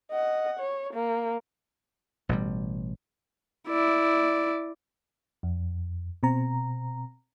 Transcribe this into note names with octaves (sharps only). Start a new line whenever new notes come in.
D#5 F#5
C#5
A#3
A1 B2 D3 G3
E4 D5
F2
B2 C4 A#5